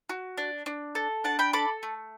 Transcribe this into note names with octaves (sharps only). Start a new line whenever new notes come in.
F#4
D4
D4
A4
D4 F#5 A5
G5 B5
A4 B5 D6
A3